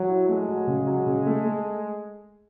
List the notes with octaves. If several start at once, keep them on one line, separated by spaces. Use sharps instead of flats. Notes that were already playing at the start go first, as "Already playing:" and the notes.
Already playing: F#3
E4
G#3 A3
F#3
C#3
F#3
C#3
A3
A3